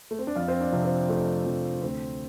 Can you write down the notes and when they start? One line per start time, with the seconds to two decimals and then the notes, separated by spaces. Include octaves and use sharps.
0.11 A3
0.19 C4
0.27 D4
0.35 F2 F4
0.48 C4
0.60 D4
0.72 C3 F3
0.85 C4
1.09 F2 A3
1.46 C3 F3
1.82 D2 C4